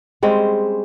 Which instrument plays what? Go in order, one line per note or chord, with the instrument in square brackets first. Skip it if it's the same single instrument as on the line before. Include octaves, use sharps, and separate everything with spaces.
[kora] G3 G#3 C4 C#4